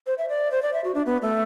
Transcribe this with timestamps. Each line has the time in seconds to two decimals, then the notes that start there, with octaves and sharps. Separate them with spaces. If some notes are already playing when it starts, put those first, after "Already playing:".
0.07 C5
0.18 E5
0.29 D5
0.51 C5
0.62 D5
0.73 E5
0.84 F#4
0.95 D4
1.06 B3
1.22 A3